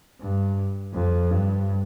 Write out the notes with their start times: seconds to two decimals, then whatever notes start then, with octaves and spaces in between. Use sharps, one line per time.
0.21 G2
0.94 F2
1.31 G2